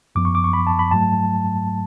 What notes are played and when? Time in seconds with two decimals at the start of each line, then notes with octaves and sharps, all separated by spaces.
0.15 F#2 F3 B3 D6
0.25 C#6
0.35 D6
0.44 C#6
0.53 B5
0.67 A5
0.79 B5
0.91 G#2 F#3 A3 A5